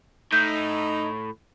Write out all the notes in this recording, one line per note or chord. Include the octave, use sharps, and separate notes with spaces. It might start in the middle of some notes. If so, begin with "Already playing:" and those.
A2 D#4 G6